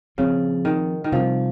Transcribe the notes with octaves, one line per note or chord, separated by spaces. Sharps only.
A#2 C#3 F3 C4
D#3
D#3
C3 F3 G3 C4